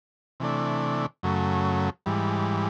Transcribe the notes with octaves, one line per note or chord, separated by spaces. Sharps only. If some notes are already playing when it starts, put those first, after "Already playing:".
C3 E3 A3 D4
F#2 C#3 F#3 A3
G#2 E3 G3